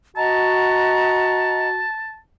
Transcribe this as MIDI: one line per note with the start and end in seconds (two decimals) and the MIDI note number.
0.16 1.85 66
0.16 1.68 75
0.16 1.68 78
0.16 2.19 81
0.16 1.68 82